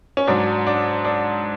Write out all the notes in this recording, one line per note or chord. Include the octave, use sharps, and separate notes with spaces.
C#4
G#2 F#3 D4
D4
D4